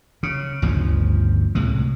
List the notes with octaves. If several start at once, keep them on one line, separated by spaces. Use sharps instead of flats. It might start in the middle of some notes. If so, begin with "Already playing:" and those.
C#3
G1 D2 C#3 F3
C2 A2 G#3